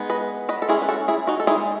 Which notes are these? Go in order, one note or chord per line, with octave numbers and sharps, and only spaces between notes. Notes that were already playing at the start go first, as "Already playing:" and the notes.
Already playing: G#3 B3 D#4
B4 D#5
B4 D#5
A4
G#3 C#4 E4 G#4
B4
F#4 A4
E4 G#4
D#4 F#4
A4
G#3 D#4 E4 G#4